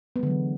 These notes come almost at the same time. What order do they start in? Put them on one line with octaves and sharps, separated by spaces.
B3 G#3 D3 F#3 E3